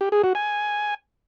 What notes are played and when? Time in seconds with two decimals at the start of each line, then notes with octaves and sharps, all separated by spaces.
0.01 G4
0.12 G#4
0.24 F#4
0.35 G#5